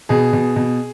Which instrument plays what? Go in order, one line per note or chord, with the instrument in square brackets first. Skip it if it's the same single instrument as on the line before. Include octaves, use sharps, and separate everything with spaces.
[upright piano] B2 G#4
B2
B2